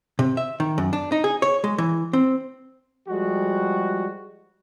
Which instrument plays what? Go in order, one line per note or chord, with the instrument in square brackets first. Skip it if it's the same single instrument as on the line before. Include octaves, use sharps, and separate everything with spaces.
[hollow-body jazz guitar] C3
E5
D#3
F#2
D4
D#4
G#4
C#5
G#3
E3
C4
[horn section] F3 G3 G#3 F#4